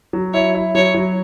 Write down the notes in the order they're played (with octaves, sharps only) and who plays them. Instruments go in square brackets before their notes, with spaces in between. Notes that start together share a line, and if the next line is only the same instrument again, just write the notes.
[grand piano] F#3
[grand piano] E4 [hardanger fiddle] C#5
[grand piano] E4
[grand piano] F#3 [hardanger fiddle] C#5
[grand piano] F#3